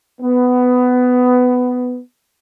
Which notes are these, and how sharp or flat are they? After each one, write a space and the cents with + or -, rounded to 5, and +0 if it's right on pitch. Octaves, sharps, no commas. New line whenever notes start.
B3 +15